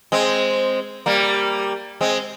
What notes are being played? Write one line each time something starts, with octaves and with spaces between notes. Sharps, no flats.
G#3 C4
G3 A#3
G#3 C4